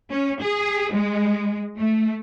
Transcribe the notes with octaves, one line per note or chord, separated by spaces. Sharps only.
C#4
G#4
G#3
A3